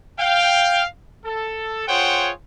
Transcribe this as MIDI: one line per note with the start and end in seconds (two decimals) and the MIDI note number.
0.19 0.84 77
0.19 0.84 79
1.26 1.86 69
1.88 2.31 65
1.88 2.31 68
1.88 2.31 72
1.88 2.31 73
1.88 2.31 78
1.88 2.31 79